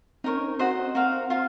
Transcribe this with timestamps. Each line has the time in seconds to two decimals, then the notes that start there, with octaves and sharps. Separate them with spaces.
0.24 C4 D#4 A#4 C#5
0.36 C#4
0.48 C4
0.59 F#4 C5 D#5
0.95 C4 F#4 A#4 F5
1.30 F4 A#4 F5